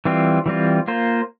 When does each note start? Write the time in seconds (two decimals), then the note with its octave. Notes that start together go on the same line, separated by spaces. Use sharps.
0.05 E3 G3 C4 F4
0.46 E3 G3 C4 F4
0.88 A#3 F4 C5